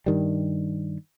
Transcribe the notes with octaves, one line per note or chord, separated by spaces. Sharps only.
G2 D#3 G3